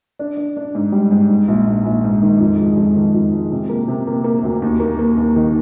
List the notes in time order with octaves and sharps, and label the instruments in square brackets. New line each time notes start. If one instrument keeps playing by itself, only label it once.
[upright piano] D4
D4
D4
G#2
G3
G#2
G#2
A#1
A#1
A#1
G#2
D#3
F2
G#3
F2
D#3
F2
G#3
C3
A#3
C3
A#3
A#3
D2
D#2
A#3
A#3
D#2
D#3